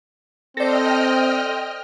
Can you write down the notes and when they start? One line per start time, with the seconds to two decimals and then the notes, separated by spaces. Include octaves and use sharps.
0.57 C4 A4 C5 D5 D#5 G5 F6 A#6